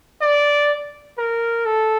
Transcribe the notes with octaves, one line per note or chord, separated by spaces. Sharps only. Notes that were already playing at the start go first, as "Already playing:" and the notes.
D5
A#4
A4